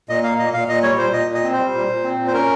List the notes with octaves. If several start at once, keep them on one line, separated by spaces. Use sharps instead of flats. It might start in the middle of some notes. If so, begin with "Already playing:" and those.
A#2 D#5
A#3 F5
A#2 D#5
A#2 F5
A#2 D#5
G3 C#5
A#2 C5
A#2 D#5
A#2
D#5
C4
C5
G3
A#2
A#2
C4
A#2
C5
C#4 A#4